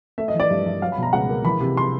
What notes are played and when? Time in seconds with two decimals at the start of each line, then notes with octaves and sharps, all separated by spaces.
0.18 A3 E5
0.28 D#5
0.34 E3
0.40 D5
0.50 G2
0.66 G2
0.81 F#3 F5
0.92 B5
0.98 B2 A#5
1.13 C#2 F#5
1.29 A#3
1.45 E3 B5
1.61 C3
1.77 C6